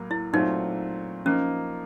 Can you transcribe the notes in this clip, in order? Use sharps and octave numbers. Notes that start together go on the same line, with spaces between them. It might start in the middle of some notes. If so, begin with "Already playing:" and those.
Already playing: A2 F#3 A#3
E4
A#2 F#3 A3 C4 D#4 F4
F3 A#3 C#4 D#4